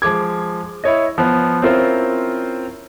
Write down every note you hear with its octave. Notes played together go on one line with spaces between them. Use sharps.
F3 G#3 D6 G#6
E4 C#5 D#5
F3 B3
C4 C#4 E4 F4 A#4 C5